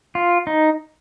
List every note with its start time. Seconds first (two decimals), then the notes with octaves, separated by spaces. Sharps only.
0.15 F4
0.47 D#4